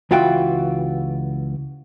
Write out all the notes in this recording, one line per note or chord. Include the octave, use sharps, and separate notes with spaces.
C#2 E3 F4 F#4 G5